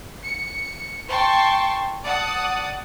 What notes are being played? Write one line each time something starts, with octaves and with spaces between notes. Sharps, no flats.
C#7
G5 A5 C6 C#6
D5 F#5 A5 D#6